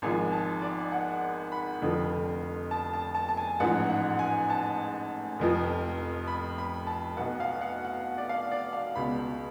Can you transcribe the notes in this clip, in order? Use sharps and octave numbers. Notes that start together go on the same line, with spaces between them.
G#1 G#2 F3 G#5
A5
D5
F#5
B5
F1 F2 D3 F3
A5
A5
A5
A5
G#5
A1 G#2 F3 F#5
F#5
G#5
A5
F1 F2 F3
B5
B5
A5
B1 B2 F#5
F5
F#5
F#5
D5
F5
D5
F5
C#2 B2 B5